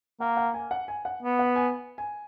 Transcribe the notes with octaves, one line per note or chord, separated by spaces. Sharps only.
A#3 F#5
F#5
G#5
F#5
G#5
F#5
B3
F#5
G#5
G#5